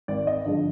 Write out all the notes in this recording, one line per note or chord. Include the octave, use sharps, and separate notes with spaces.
G#1 D5
D#5
G2 D3 F3 G#3